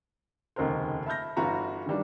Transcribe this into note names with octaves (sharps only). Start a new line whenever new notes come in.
F1 D#2 C#3 A#4 C5
E5 A5 B5 F6 G6 A#6
G1 E3 F4 F#4 A#5 B5
D#3 E3 G3 D4